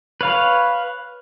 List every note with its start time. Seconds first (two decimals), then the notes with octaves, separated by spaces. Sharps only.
0.21 B4 C#5 F5